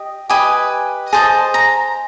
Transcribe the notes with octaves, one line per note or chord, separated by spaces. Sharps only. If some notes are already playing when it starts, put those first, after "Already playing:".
Already playing: G4 D#5
G4 B4 D#5 G#5
G#4 C5 D#5 A5
A#5